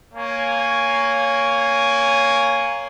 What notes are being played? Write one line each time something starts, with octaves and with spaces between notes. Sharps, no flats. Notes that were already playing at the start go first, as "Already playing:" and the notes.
A#3 C#5 G#5